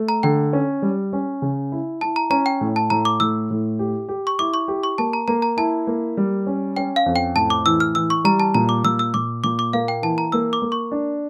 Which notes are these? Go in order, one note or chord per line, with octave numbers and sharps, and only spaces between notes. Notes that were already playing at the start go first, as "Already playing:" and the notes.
Already playing: A3
A#5
D3 G5
C#4
G3
C#4
C#3
E4
E4 A5
A#5
C#4 A#5
G5
A2
A5
A2 A#5
D6
A2 E6
A2
G4
G4
C#6
E4 D6
C#6
G4
C#6
A#3 A5
A#5
A#3 A#5
A#5
E4 A5
A#3
G3
C#4
C#4 G5
F5
F2
G5
A2 A5
D6
E3 E6
F6
E3 E6
C#6
G3 A#5
A5
A#2 A#5
D6
A#2 E6
E6
A#2 D6
A#2 D6
D6
A#3 F5
G5
E3 A5
A#5
A#3 E6
D6
A#3
C#6
D4